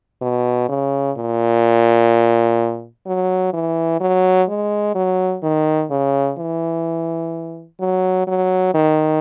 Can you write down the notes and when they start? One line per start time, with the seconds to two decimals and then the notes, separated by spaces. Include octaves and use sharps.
0.21 B2
0.69 C#3
1.17 A#2
3.06 F#3
3.53 E3
4.00 F#3
4.48 G#3
4.95 F#3
5.43 D#3
5.90 C#3
6.38 E3
7.80 F#3
8.27 F#3
8.75 D#3